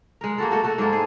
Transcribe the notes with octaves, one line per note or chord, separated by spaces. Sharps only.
G#3 A#4
A#3 F#4 A4
A3 F#4 A4
A3 F#4 A4
G#2 G#3 A#3 A4
G#4